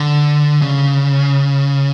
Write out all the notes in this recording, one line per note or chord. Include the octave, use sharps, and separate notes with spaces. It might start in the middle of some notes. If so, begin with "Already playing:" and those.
Already playing: D3
C#3